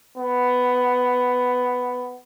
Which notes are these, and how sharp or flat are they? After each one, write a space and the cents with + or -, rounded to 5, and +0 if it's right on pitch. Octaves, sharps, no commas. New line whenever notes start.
B3 +10